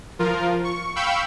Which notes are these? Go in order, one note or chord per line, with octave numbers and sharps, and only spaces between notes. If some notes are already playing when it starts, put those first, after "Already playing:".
F3 F4 A#4
C#6
F5 G5 B5 C#6 E6 G6